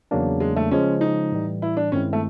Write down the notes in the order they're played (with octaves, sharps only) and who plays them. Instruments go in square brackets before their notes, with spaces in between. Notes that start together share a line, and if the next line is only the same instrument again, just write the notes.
[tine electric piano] E2 C#3 F#3 A#3 D4
[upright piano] G#3
A3
[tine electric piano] C#3 F3 G#3 [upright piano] C#4
[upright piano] D#4
[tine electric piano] A2 E3 G3
[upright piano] E4
D4
[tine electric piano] G2 D#3 G#3 C4 E4 [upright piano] C#4
[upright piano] A3